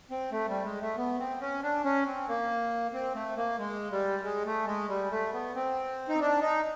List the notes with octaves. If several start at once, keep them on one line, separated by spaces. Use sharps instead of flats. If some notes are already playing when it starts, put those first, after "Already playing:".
C4
A3
G3
G#3
A3
B3
C4
C#4
D4
C#4
C4
A#3
C4
A3
A#3
G#3
G3
G#3
A3
G#3
G3
A3
B3
C4
D#4
D4
D#4